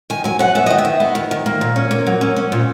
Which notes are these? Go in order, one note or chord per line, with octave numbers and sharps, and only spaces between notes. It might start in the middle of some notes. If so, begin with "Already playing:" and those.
D#3 G#5
F#3 G#5
F#3 F#5
B3 E5
D#3 D#5
E5
D#3
B3
D#3
D#3
A#3
A#2
C#4
A#3
F#3
C#4
C#4
A#2